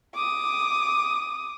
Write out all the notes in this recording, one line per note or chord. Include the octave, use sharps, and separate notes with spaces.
D6 D#6